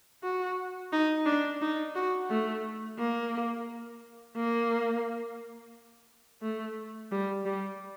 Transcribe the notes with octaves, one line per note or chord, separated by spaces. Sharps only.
F#4
D#4
D4
D#4
F#4
A3
A#3
A#3
A3
G3
G3